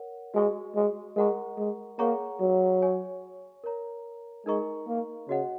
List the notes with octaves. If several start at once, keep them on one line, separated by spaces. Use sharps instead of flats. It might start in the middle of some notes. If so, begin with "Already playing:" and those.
Already playing: A#4 C#5 F#5
G#3 F#4 D#5 G#5 C#6
G#3
G#3 A#4 F#5 A#5 C#6
G#3
A#3 G#4 C#5 F#5 A#5 C#6
F#3
C#5 G#5 C#6
A#4 C#5 A#5
G#3 D#4 A#4 D#5 A#5 C#6
A#3
C#3 F#4 D#5 F#5